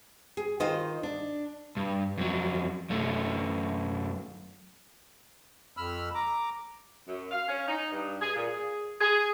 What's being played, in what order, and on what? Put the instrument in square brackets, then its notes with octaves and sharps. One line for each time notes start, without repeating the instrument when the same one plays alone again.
[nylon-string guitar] G#4
D#3 F4 C5 D#5
D4
[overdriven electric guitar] G2
F2 F#3
F#2 A3
[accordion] F2 B5 E6 F6
A#5 D6
[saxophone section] F#2
F5
C#4
D#4
G2
G#4
A#2
G#4
G#4